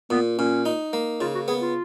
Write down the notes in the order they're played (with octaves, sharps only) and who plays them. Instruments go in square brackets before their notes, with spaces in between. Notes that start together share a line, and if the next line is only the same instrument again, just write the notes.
[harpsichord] A#2 [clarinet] B3
[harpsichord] A#2 [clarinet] C#4
[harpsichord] D#4
A#3
[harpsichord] C#3 [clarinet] F4
[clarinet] F#4
[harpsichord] B3 [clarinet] G#4
[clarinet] F4